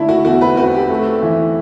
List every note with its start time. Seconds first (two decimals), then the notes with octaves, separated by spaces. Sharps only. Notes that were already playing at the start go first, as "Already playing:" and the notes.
Already playing: D3 A3 D4 E4
0.09 F#4
0.25 E2 F#4
0.41 B4
0.57 C4 F#4
0.74 G4
0.90 A3
1.22 E3